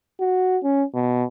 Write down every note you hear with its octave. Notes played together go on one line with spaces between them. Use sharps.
F#4
C#4
B2